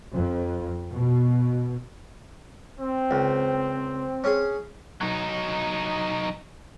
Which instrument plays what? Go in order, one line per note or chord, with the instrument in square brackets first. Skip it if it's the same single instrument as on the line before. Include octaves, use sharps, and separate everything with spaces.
[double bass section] F2
B2
[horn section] C4
[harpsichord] C#2
C#4 G#4
[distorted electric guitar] F#3 D#4